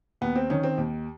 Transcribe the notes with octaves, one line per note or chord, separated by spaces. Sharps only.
D#2 B3
C4
D#3 C#4
C4
D#2